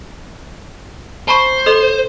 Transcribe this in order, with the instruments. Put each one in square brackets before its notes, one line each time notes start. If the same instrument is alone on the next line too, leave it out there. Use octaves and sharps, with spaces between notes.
[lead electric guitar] C5 [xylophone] A5 B5 C#6
[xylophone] A4 D#5 C6